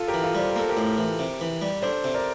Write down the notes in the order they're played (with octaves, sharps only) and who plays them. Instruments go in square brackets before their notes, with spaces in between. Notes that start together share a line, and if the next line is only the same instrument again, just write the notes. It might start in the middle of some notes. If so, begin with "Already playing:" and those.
Already playing: [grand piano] F4 A4
G4 A#4
[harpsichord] E3
[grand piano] F4 A4
[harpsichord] G3 [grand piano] C5
[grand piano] A#4
[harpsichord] A#3 [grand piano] A4
[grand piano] G4 A#4
[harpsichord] A2
E3
C3
E3
G3
[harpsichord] D4 [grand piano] A4 C5
[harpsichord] C3
[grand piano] A#4 D5